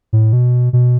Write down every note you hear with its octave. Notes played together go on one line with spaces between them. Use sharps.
A2
B2
B2